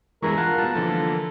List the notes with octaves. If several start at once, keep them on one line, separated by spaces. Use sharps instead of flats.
E2 G2 E3 G#3 A#4 C#6
F4 F#5 A5
B2 G3 A5
D3 E3 F3 A#3 A4